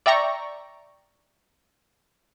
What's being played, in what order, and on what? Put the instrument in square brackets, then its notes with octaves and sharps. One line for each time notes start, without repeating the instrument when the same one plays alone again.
[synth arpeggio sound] D5 E5 G5 A#5 C#6